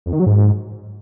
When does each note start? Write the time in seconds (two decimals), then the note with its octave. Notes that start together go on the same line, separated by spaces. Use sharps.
0.06 F2
0.13 D#3
0.20 F#3
0.26 G#2